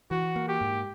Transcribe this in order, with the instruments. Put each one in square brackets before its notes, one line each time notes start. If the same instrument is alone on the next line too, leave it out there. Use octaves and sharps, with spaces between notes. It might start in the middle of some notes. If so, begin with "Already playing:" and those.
[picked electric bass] E3 [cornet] F#4
[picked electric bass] A#3
[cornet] G4
[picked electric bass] G#2